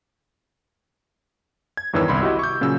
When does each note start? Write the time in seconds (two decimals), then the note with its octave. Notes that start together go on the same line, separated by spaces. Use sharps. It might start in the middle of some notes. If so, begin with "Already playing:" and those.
1.77 G#6
1.93 E2 G2 D#3 E3 C#5 E6
2.08 G1 C2 B5 C6
2.22 E4 F#4 G4 D#5
2.39 C#6 D6 G6
2.61 A#2 C#3 F#3 C#4 E6